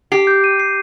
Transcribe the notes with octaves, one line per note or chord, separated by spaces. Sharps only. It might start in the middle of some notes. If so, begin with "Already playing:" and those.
G4 C7
G6
D#7
C7